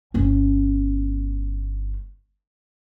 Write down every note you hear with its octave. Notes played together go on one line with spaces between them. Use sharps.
G1 C#4